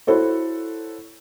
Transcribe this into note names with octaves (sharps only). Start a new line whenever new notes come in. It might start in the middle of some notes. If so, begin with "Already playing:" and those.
E4 F#4 A4 C5 C#5